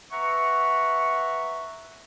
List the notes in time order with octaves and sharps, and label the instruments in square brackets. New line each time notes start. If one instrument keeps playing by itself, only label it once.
[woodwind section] B4 E5 F#5 A#5 C#6